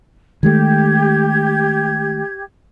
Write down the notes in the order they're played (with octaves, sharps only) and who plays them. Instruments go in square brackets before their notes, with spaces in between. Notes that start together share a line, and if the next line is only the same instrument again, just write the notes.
[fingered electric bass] D#3 G#3 A3 [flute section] G4 G#6